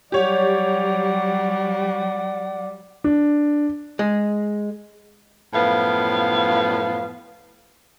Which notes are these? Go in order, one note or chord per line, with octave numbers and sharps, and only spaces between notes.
F#3 G3 G4 C#5 D5 F#5
D4
G#3
F#2 A2 F3 B3 F5